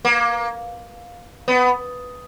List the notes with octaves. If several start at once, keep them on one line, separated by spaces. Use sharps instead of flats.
A#3
B3